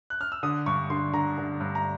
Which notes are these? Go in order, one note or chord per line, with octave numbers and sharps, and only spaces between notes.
F#6
F6
E6
D3 D#6
G2 C#6
D3 C6
D3 A#5
D3
G2
A#5